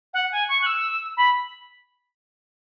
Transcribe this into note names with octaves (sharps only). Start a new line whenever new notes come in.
F#5
G#5
C#6
F#6
E6
B5